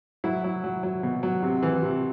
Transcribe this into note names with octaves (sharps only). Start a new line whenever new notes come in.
F#3 E4
F#3
F#3
F#3
B2
F#3
C3
E3
C3